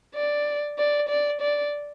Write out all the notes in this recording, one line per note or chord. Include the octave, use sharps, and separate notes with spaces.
D5
D5
D5
D5